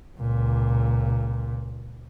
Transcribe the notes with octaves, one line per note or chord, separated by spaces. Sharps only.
C#2 A#2